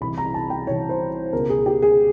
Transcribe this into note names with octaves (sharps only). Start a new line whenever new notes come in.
C2 C3 E3 B5
A#5
A5
G5
C2 C3 E3 C#5
C5
C#2 B2 A#4
G#4
G4
G#4